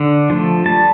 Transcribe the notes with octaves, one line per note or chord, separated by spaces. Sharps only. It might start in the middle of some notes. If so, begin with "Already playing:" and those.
Already playing: D3
F3 A3
G3 A5